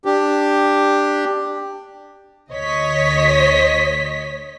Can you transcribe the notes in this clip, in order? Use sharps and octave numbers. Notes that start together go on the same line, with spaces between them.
D4 G4
D2 C#5 D#5 B6